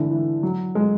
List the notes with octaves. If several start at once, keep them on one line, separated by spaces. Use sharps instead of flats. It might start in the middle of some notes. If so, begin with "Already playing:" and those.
Already playing: D3 E3
E3
F#3
G#3